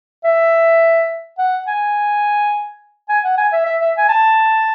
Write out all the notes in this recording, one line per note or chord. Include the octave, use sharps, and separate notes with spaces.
E5
F#5
G#5
G#5
F#5
G#5
E5
E5
E5
G#5
A5